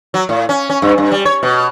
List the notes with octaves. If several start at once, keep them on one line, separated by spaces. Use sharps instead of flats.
F#3
A2
C#4
C#4
G2
G2
G3
C#5
B2